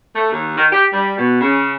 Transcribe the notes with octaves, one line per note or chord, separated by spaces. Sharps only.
A3
D#2
D#3
G4
G3
B2
C#3